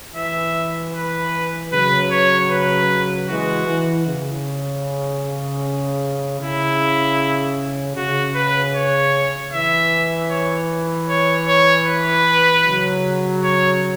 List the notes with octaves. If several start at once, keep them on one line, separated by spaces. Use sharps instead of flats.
E3 E5
B4
C#3 F#3 B4
C#5
B4
E3 G#3 F#4
E3
C#3
C#3 E4
C#3 F#4
B4
C#5
E3 E5
C#5
C#5
C#5
B4
C#3 F#3
C#5